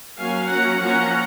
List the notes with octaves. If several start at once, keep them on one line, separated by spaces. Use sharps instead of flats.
F#3 A#3 C#4 F5 G#5
F#3 A#3 C#4 F#5 A#5
F3 A#3 C#4 F#5 A#5